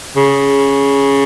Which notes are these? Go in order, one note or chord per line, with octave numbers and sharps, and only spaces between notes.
C#3